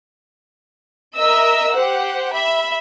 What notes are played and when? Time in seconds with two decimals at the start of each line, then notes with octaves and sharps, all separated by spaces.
1.18 A#4 D#5 E5 E6
1.74 G4 C5 F#5
2.34 E5 B5